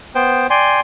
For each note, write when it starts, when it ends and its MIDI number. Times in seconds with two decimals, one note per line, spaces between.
0.15 0.47 59
0.15 0.47 72
0.15 0.47 79
0.50 0.80 74
0.50 0.80 79
0.50 0.80 80
0.50 0.80 84